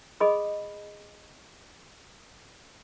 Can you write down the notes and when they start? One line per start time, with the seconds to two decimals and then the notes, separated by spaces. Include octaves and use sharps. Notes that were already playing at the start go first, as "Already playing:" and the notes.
0.20 G#4 D#5 B5 D#6